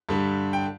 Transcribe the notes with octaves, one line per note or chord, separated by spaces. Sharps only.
G2 D3 G3
G5